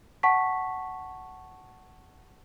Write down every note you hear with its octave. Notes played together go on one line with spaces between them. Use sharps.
F#5 A5 C#6 B6